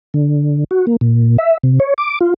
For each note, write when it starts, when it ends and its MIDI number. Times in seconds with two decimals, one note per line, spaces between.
0.14 0.64 50
0.71 0.86 66
0.87 0.96 58
1.01 1.37 46
1.38 1.57 76
1.63 1.79 48
1.80 1.94 73
1.98 2.19 86
2.21 2.34 65